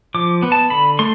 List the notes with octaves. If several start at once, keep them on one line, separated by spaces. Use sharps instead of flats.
F3 D6
B3
A5
D3 B5
A3 C6